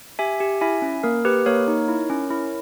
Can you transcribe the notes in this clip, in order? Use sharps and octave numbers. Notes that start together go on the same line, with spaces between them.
G4 E5 G#5
G4
E4 E5 G#5
C#4
A#3 A#4
G4 B4
A#3 A#4 C#5
D#4
E4
C#4
E4